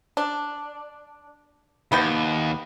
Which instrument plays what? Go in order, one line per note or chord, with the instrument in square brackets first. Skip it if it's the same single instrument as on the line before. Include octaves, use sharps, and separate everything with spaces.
[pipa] D4
[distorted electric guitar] D#2 [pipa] B3 B4 G5